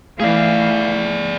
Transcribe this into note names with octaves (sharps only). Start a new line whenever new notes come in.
E3 A3 G#4 D5 F5